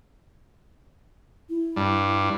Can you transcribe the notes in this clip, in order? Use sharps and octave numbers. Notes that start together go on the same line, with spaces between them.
E4
G2